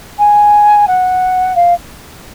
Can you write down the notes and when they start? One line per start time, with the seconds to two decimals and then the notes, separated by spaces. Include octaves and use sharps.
0.19 G#5
0.87 F#5
1.55 F5